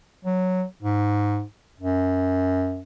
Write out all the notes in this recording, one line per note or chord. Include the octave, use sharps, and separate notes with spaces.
F#3
G#2
F#2